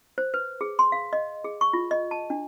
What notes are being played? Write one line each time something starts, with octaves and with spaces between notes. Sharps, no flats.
C5
B4
G#4
C6
F5
D#5
G#4
C#6
F4
D#5
A5
D4